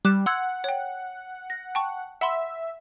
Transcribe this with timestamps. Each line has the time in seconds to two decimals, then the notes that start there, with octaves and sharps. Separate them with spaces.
0.05 G3 D6 F#6 E7
0.26 F#5 C6 E6 G#6
0.64 C#5 G5
1.50 A#6
1.75 G5 A5 C#6
2.21 E5 F#5 B5 C6